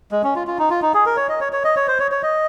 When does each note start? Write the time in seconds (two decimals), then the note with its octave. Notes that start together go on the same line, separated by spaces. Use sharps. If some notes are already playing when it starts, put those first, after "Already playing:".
0.11 G#3
0.23 C#4
0.36 F4
0.47 F4
0.59 D#4
0.70 F4
0.82 D#4
0.94 G#4
1.06 A#4
1.17 C#5
1.29 D#5
1.41 C#5
1.53 C#5
1.64 D#5
1.76 C#5
1.88 C5
2.00 C#5
2.11 C#5
2.23 D#5